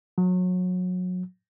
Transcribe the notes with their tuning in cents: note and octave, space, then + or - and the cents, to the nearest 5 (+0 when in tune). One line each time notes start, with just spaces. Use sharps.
F#3 -25